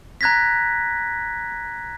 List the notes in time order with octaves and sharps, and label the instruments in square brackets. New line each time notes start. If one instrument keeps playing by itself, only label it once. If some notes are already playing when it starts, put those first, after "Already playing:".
[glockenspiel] A#5 F#6 G#6 A#6 B6